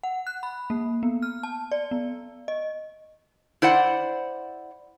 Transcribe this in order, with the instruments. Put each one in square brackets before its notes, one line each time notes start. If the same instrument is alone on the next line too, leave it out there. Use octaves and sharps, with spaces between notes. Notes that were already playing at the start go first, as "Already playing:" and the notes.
[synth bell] F#5
F#6
B5
A#3
B3
F6
A5
D5
B3
D#5
[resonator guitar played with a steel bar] E4 C5 D5 F#5